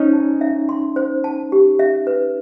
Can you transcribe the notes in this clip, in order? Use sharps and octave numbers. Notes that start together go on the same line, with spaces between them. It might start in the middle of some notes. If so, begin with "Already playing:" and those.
Already playing: C#4 D#4 C5
A5
E5
C6
C5
A5
G4
E5
B4